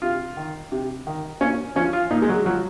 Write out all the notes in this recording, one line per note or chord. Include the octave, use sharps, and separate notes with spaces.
C3 F4
D#3
C3
D#3
A#2 C#4
F3 C#4
F4
A#2 D#4
G#3
F#3
F3 F#3